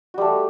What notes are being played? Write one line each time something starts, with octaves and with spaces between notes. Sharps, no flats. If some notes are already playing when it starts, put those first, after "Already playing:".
G3 A3 F#4